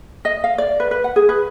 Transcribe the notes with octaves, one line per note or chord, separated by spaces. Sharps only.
D#5
F5
D5
B4
B4
F#5
G#4
B4